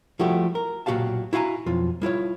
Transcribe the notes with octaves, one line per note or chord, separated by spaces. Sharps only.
F3 G3 A3 E4 F#4 G4
A#4
B1 A#2 F#4 G4 F5 A5
E4 F#4 F5 G#5 A#5
B1 F2 F4
G3 E4 F4 C#5